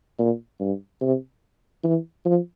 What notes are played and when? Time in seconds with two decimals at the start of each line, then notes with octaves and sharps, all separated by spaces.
0.19 A#2
0.60 G2
1.01 C3
1.84 E3
2.25 F3